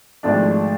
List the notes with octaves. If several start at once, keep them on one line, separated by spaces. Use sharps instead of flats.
G#1 G#2 F3 A3 D4